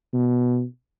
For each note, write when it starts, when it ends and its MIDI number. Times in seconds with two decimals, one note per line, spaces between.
0.14 0.65 47